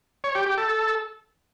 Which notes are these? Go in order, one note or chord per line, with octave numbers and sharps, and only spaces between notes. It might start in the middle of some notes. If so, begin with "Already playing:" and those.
C#5
G4
G4
A4